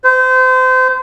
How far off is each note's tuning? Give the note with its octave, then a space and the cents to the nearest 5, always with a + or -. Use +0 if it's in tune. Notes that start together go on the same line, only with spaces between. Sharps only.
C5 -30